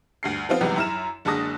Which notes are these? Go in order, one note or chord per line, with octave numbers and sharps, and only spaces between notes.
D2 G2 C7
F3 B3 C4 F4
C#2 F#2 C3 E3 G3 B3
F#2 E4 A#5 F6 E7
F#1 D3 G#3 A5 D#6 A#6